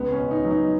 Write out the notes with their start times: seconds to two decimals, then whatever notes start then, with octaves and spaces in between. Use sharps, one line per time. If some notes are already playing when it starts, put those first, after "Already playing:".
Already playing: C#2 B3
0.12 C#4
0.19 B2
0.31 D#4
0.44 F#3
0.51 D#4